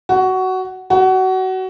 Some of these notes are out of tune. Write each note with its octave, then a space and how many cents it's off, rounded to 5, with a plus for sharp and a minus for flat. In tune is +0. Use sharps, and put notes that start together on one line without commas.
F#4 +15
F#4 +25